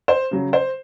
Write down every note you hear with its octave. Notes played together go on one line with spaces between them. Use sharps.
C5
C#3 F#3
C5